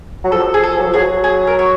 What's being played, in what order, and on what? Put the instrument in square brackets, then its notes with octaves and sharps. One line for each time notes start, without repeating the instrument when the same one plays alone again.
[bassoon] F#3
[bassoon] F3 [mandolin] A4
[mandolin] G#4
A4
[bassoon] F#3
F3
[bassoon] F#3 [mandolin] G#4
[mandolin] G#4
A#4
C#5